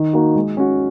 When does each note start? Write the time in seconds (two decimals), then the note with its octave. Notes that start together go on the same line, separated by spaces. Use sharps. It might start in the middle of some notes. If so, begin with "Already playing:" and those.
Already playing: D#3
0.13 A#3 D#4 F#4
0.36 G#3
0.57 C#4 F#4